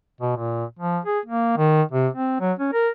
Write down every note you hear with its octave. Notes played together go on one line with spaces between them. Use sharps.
B2
A#2
F3
G#4
A#3
D#3
C3
C4
F#3
C#4
A#4